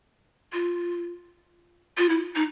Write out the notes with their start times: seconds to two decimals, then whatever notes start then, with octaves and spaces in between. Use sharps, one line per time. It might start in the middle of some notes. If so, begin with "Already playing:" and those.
0.53 F4
1.98 F4
2.09 E4
2.36 D#4